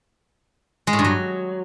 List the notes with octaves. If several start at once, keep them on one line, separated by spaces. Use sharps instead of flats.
G#3
A2
G2
F#3